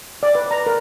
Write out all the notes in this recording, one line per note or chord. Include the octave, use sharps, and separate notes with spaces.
D5
B4
A#5
A#4